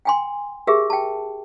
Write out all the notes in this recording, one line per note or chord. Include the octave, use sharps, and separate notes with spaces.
G5 G#5 C6
G4 G#4 A#4 E5
G5 A5